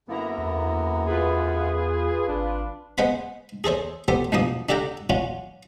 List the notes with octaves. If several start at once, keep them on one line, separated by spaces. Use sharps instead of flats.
F#2 D3 A#3 B3 E4 A#5
E2
F4 G#4 B4
G#1 D4
G#3 B3 C5 F#5 B5
G#4 A4 C5 C#5
B3 G4 A4 C5
B1 E2 G2 F3 A#3 D#6
D4 G4 A4 F#5 G5 A#5
F#3 C#4 F4 F#4